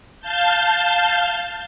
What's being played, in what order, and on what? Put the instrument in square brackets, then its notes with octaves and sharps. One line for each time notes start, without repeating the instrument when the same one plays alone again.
[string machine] F5 A5 G6